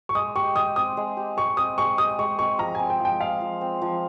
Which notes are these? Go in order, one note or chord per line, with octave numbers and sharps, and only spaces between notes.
C#6
G#3 D#6
G4 C#6
G#3 D#6
C4 D#6
G#3
G4
G#3 C#6
C4 D#6
G#3 C#6
G4 D#6
G#3 C#6
C4 C#6
F3 A#5
C4 G#5
G5
F3
G5
G#3 F5
F3
C4
F3